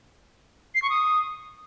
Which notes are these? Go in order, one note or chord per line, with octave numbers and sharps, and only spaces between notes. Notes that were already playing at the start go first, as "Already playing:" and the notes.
C7
C#6
D#6